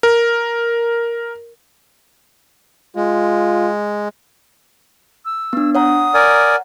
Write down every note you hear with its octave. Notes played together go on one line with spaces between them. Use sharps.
A#4
G#3 F4
E6
B3 D4
C#5 F#5 A#5 D#6
A#4 D5 G#5